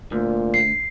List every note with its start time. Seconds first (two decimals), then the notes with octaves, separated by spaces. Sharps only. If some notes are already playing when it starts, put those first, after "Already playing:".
0.12 D2 A#2
0.54 C7